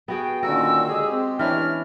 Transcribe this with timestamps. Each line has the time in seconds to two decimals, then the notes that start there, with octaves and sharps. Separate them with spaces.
0.08 B3 F#4 G#4 G5
0.43 A#2 D3 D#3 C#4 F#4 A#4 E6
0.88 G#3 G4 G#4
1.11 C4
1.39 E3 B3 C#4 D4 F6